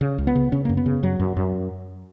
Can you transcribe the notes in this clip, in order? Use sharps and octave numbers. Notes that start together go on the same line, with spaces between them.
C#3
C#2
B3
C#3
C#3 C#4
F#2 A#3
B3
C#3
F#2 F#3
F#2
F#2